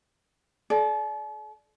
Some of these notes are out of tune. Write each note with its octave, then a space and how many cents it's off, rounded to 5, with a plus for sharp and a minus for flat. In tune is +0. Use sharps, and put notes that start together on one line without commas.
A4 -45 D5 +0